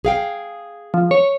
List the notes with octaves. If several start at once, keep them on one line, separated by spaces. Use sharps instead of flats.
G#4 F5 G5
F3
C#5